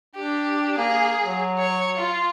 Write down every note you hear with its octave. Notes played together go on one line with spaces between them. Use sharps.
D4 G4
A#3 G#4
F#3
C#5
F4